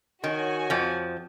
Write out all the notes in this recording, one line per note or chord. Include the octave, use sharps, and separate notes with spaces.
D#3 F#4 C#5 G#5
F2 F3